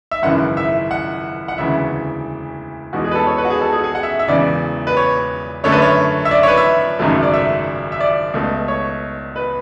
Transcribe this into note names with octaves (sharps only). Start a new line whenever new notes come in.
E5
G#1 F#2 C#3 E3 F#5
E5
F#5
F#5
E1 D2 C#3 E3 E5
E2 B2 G#3 F#4
G#4
B4
A4
C#5
B4
F#4
G#4
A4
G#4
G#4
F#5
E5
E5
E1 E2 C#3 D5
B4
C#5
F#2 D3 A3 C#5
B4
C#5
E5
D5
C#5
B4
E5
G#1 F#2 C#3 F#3 A3
D5
E5
E5
D5
C#2 B2 A3
C#5
B4